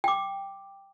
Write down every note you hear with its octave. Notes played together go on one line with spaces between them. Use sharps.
G5 D6